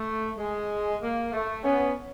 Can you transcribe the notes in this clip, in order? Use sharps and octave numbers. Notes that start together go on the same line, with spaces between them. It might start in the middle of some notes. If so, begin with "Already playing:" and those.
Already playing: A3
G#3
A#3
A3
B3 C#4